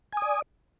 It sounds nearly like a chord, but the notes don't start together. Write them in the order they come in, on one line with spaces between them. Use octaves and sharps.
G#5 D#6 D5